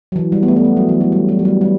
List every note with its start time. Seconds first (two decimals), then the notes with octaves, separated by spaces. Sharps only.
0.12 F#3
0.16 E3
0.32 G3
0.43 B3
0.48 A3
0.56 B3
0.65 A3
0.77 F#3
0.89 E3
1.01 F#3
1.12 G3
1.29 G3
1.39 F#3
1.45 G3
1.61 G3